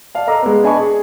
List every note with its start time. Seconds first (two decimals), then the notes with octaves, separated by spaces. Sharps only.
0.15 D5 F5 A5
0.27 A4 D#5 A#5 D6 E6 F6
0.42 G#3 B3
0.64 D4 D#5 G#5 B5 C#6
0.79 G#4